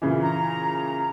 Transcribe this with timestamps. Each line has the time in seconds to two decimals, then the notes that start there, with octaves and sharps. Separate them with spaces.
0.02 A#2 C#3 E3
0.22 A#5